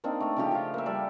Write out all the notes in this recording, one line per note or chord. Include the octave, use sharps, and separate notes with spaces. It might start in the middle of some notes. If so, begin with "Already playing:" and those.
A#3 C4 D4 D#4
A3 A#5
C#3 F3 G4 D6
F3 F4
A#3 E5
G3 A4 D5